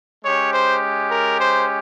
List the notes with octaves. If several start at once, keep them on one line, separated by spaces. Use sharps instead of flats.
G#3 C#4 G4 C#5
C5
A#4
C5